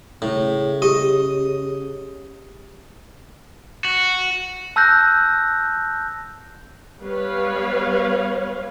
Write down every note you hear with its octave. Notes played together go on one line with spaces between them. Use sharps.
A2 C#3
G4 D#5
F#4
A5 E6 F#6 G6 A#6
G3 B3 B4 C#5 F5